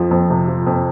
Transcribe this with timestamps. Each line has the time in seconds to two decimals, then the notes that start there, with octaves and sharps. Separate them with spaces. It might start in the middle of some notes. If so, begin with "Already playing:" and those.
Already playing: F2 F3
0.11 F2
0.30 C3
0.48 F3
0.66 F2